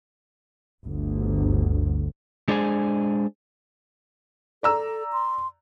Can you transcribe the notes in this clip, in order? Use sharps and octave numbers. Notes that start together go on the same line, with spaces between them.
G1 D2
G#3 D4 G#4 C5 G#5
A4 D5 A#5 E6
C6